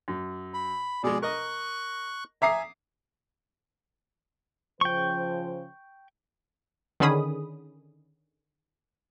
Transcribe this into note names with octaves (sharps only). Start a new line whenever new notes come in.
F#2
B5
B2 G#3 G#4 D5
A#4 D#5 C#6 F#6
E5 G#5 A#5 D6 D#6 C7
C#3 F3 C5 G5 C#6
D3 D#3 C#4 G#4 B5 D#6